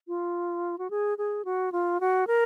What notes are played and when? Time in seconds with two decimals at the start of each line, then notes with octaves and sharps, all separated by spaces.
0.08 F4
0.78 F#4
0.91 G#4
1.18 G#4
1.45 F#4
1.72 F4
2.00 F#4
2.27 A#4